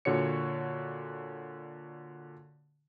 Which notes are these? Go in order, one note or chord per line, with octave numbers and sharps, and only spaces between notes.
A#2 D3 F#4 C#5 C#7